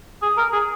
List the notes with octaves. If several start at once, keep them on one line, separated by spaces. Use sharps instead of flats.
G#4
A#4
G#4